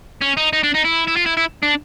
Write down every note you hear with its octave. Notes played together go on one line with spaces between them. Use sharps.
C#4
D#4
D#4
D4
D#4
E4
E4
F4
E4
E4
D4